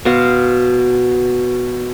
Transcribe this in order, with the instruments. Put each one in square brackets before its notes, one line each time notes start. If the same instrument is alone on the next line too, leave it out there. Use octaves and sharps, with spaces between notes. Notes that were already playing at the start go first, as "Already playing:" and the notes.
[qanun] B2 F#4 C5 F5